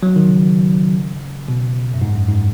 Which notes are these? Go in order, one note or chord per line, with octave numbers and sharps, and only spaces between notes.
F#3
D#3
C#3
B2
F#2
G#2
F#2
G#2